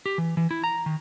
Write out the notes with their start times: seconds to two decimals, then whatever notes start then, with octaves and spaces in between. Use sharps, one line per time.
0.06 G4
0.18 E3
0.37 E3
0.51 E4
0.64 A#5
0.86 D#3